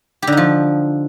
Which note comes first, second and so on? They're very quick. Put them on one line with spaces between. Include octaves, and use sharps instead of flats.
G4 D3 D#4 F3